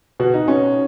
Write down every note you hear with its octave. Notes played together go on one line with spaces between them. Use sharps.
B2 F#4
D#4
B2 C#4